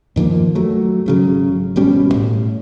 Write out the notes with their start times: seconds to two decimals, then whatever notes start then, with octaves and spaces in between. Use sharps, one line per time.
0.16 G2 D#3 F3 A#3
0.55 F#3 A3
1.06 G#1 C#3 F#3
1.76 G#1 B2 G3 C#4
2.14 A2